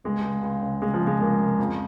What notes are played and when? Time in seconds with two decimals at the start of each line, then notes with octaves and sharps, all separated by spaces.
0.04 C#2 G#3
0.24 C#2
0.43 C#2
0.62 C#3
0.82 C#3 G#3
0.94 F3
1.02 C#3
1.07 G#3
1.20 C#2 A#3
1.40 C#3
1.59 F2